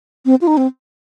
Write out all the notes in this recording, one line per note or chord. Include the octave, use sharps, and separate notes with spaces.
C4
F4
D#4
C4